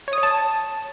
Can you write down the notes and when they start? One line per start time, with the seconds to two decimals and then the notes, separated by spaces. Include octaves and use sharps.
0.08 C#5
0.13 D#6
0.18 C#5
0.23 A5